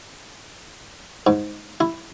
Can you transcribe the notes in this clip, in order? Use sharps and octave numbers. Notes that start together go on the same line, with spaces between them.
G#2
E4